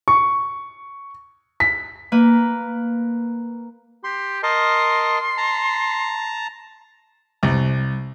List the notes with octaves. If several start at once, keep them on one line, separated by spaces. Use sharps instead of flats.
C#6
B6
A#3 B4
G4 C6
A#4 D#5 A5 C6
A5 A#5
C2